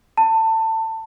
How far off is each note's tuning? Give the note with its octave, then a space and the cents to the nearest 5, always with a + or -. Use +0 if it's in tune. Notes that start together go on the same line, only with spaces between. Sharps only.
A5 +25